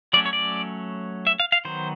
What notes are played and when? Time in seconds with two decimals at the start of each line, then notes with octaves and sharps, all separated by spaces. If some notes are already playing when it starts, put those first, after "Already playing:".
0.13 F#3 A3 C#4 D5
0.26 C#5
0.33 D5
1.27 E5
1.40 F5
1.52 F5
1.65 D#3 F#3 B3 C5